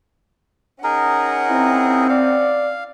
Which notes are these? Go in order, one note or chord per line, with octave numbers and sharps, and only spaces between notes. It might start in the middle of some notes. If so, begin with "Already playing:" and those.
C#4 D#4 G#4 A#4 F#5
C4 E4
D5 F5